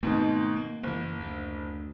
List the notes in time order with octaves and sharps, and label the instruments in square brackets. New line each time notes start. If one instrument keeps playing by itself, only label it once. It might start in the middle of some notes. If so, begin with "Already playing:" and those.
[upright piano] G#2 B2 D#3 [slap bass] A3 C4
[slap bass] A#3
[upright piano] F#1 [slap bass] E3 A#3
[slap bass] D2